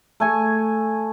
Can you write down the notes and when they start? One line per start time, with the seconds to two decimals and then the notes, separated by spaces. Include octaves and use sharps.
0.20 A3 G#5 C#6